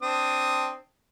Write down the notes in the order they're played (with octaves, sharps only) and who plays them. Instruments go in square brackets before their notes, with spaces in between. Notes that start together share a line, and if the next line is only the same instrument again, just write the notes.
[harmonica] C4 D4 D#6